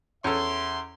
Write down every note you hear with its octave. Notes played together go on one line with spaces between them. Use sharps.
E2 C#4 A4 E5 C6